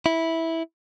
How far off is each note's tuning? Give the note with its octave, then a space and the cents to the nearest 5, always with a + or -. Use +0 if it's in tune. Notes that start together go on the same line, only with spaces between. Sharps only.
E4 -10